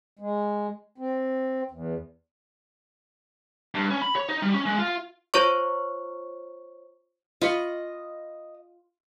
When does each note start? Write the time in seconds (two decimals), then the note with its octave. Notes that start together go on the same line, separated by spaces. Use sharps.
0.19 G#3
0.98 C4
1.71 E2
3.75 G2
3.90 C#4
4.02 B5
4.15 C#5
4.29 D#4
4.42 G3
4.54 C#4
4.66 G#3
4.78 F4
5.34 F4 C5 C#5 C#6
7.41 F4 D#5 B5 C#6